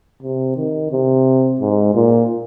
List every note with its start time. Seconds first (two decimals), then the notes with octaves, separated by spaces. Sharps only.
0.22 C3
0.56 D#3
0.92 C3
1.61 G#2
1.95 A#2